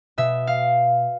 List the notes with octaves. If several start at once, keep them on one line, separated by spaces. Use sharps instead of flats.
B2 E5
F5